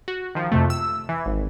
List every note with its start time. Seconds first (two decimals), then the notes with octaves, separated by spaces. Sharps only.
0.08 F#4
0.35 D#3 F3
0.52 F2 C3 A3
0.70 E6
1.09 E3
1.26 G#1